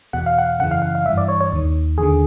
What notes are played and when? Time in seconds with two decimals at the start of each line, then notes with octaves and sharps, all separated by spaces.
0.13 E2 B2 F#5
0.26 F5
0.38 F#5
0.59 F#2 C#3 E3 F#5
0.71 F5
0.82 F#5
0.95 F5
1.05 E3 E5
1.09 G2
1.17 D5
1.28 C#5
1.41 C#5
1.53 D#2 D#3
1.98 D#2 D3 G#4